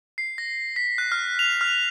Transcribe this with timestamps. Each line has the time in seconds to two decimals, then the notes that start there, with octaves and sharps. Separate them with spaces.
0.18 C7
0.38 A#6
0.76 B6
0.98 F#6
1.12 F6
1.39 F7
1.61 F6